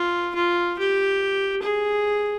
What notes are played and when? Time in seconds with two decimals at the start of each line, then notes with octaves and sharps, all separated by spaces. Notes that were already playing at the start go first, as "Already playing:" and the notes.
Already playing: F4
0.35 F4
0.78 G4
1.62 G#4